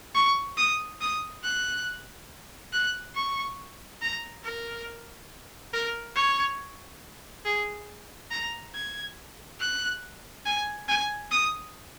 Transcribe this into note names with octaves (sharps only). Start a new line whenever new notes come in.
C#6
D#6
D#6
F#6
F#6
C#6
A#5
A#4
A#4
C#5
G#4
A#5
G#6
F#6
G#5
G#5
D#6